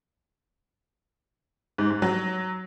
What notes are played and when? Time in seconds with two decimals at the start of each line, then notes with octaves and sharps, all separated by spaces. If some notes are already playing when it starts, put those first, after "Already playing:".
1.78 G#2
1.90 G#2
2.02 F#3